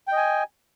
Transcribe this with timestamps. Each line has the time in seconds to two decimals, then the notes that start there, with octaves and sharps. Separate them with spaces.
0.08 G5
0.12 D#5
0.17 G#5